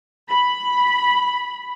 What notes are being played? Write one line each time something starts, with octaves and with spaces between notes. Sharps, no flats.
B5